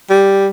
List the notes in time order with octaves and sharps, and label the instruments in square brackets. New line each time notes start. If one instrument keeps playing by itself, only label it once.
[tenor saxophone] G3